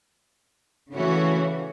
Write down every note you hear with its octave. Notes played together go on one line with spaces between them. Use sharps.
C#3 E3 A3 C#4 F#4